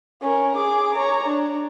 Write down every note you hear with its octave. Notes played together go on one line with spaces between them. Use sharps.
C#4 A#4
G#4 D6
C#5 A#5
D4